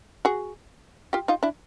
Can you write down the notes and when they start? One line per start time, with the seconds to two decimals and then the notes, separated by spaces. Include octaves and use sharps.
0.25 F#4 G#4
1.13 F4 G4
1.28 D#4 F4
1.43 D4 E4